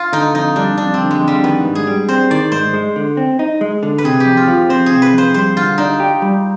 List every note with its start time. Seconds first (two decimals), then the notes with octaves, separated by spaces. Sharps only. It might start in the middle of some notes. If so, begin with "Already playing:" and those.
Already playing: F4
0.13 D3 D#4
0.35 F2 D#4
0.56 G3 D4
0.77 F2 D4
0.94 C4
1.00 D3
1.11 G#3
1.22 F2
1.28 G3
1.43 D#3 B3
1.65 G#2
1.75 G#4
1.87 G3
2.08 C4 C5
2.30 D#3 D5
2.52 G#2 C5
2.74 G#3
2.96 D3
3.17 C4
3.39 D#4
3.61 G#3
3.83 D3
3.98 B4
4.04 C3 G#4
4.20 G4
4.26 F2
4.37 F4
4.48 F3
4.70 C4 C5
4.86 G#4
4.91 C3
5.02 B4
5.13 F2 C5
5.34 G3 C5
5.57 D3 F4
5.78 D4 D#4
6.00 G4
6.22 G3